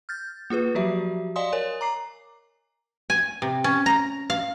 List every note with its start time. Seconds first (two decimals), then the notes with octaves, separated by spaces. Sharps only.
0.09 F6 G6 A6
0.50 A#3 F4 G#4 B4
0.75 F3 F#3 F#4 G4 E5
1.36 D5 D#5 F5 G#5 C6 D#6
1.53 A#4 C#5 G#5
1.81 A#5 D6 C7
3.10 G#5
3.42 C3
3.64 C#4
3.86 A#5
4.30 F5